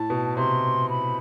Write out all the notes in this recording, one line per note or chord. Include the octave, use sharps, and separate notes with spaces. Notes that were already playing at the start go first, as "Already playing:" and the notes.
Already playing: A2 A5
B2
C3 C6
B5